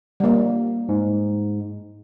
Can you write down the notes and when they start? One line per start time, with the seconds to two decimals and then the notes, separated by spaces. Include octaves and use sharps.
0.20 G3 A#3
0.89 G#2